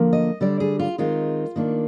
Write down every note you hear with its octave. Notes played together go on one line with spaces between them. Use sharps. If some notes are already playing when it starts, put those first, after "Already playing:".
Already playing: D3 F3 A#3
D#5
D3 G3 D4 D5
G#4
F4
D#3 G#3 C4 D#4 F4
D#3 A#3 D4